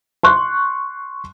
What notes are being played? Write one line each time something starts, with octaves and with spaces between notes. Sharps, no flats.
C6 C#6 F#6